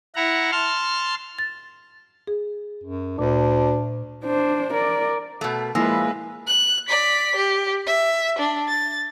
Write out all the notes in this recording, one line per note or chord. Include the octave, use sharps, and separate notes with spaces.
E4 F#5 A#5
A5 C6 F6
A6
G#4
F#2
D2 A#2 D4
D4 C5
A#4 D5
B2 A3
F3 G#3 A#3 E4 B4 G#5 E6 A#6
F#6
D5 B6
G4
E5
D4
A6